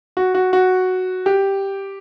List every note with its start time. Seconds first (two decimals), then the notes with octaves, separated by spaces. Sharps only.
0.17 F#4
0.35 F#4
0.53 F#4
1.26 G4